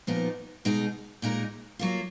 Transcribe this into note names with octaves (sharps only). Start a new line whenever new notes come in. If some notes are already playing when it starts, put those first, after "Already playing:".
A#2 F3 B3 D#4
B2 G#3 D#4 G#4
A#2 G#3 D#4 A#4
F#3 A#3 F4